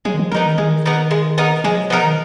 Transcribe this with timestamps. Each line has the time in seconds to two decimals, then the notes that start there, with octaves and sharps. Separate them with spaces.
0.05 F#3 G#3
0.14 D#3
0.19 F3
0.32 F3 B3 D#4 A#4
0.46 D#3
0.58 D#3 G#3
0.85 B3 D#4 A#4
1.11 G#3
1.38 B3 D#4 A#4
1.64 F3 G#3
1.77 F#3
1.90 F3 B3 D#4 A#4
2.04 D#3